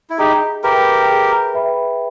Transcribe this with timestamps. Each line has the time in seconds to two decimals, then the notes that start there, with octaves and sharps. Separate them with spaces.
0.10 E4
0.18 D#4 G4 G#4
0.63 G4 A#4 B4 E5 G5 B5
1.09 G#4
1.54 B4 E5 G5 B5